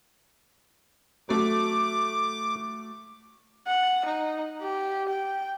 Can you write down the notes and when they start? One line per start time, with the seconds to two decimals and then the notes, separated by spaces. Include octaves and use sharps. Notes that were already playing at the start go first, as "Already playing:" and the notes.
1.29 F#3 A3 D6
3.67 F#5
4.05 D#4
4.61 G4
5.09 G5